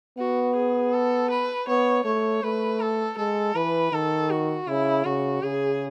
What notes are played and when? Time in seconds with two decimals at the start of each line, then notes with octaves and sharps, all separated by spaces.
0.18 B3 F#4
0.56 G#4
0.93 A4
1.30 B4
1.68 B3 C#5
2.05 A3 C#5
2.43 A3 B4
2.80 A4
3.17 G#3 A4
3.55 E3 B4
3.92 D#3 A4
4.30 F#4
4.67 C#3 E4
5.05 C#3 F#4
5.43 C#3 G#4